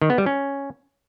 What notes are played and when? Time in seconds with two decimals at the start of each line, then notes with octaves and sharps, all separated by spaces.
0.02 D#3
0.10 B3
0.18 G3
0.26 C#4